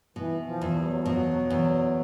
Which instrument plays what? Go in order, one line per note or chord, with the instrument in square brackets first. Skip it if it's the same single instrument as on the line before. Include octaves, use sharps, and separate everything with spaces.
[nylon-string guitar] B2 [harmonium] E3
[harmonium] F3
[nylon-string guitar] E2
[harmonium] G3
F#3
F3
[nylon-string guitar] B2 [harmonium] F#3
[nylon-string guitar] E2